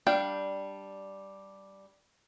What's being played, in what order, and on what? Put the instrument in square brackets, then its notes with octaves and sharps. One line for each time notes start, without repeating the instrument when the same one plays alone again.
[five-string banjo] G3 D4 F5 G5